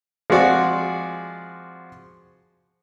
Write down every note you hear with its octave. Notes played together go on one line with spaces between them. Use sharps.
F3 G#3 C4 F#4 D5